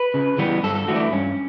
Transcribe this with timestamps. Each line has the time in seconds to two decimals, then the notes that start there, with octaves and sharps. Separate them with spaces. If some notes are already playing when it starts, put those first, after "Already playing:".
Already playing: B4
0.14 C#3
0.38 E3 G3 B3
0.63 G2 A4
0.75 A4
0.88 E3 A3 F#4
0.96 D4
1.00 E4
1.12 G2 C#4